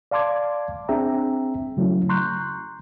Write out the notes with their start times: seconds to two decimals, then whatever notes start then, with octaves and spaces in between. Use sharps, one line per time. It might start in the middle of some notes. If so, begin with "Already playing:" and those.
0.11 D5 F5 A5 C6 D6 G#6
0.89 C4 D4 G#4 E5 G5 A#5
1.77 C#3 F#3 A3 C#4 E4
2.09 A#5 C6 C#6 F#6 G6